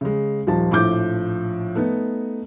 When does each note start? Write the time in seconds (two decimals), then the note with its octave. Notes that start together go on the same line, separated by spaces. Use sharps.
0.01 C#3 G#3
0.47 D#1 F3 D#4 A5
0.71 A#1 A2 F3 D6 G6
1.75 A3 B3 D#4